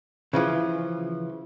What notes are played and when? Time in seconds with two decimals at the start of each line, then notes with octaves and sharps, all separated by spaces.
0.33 C#3 E3 F3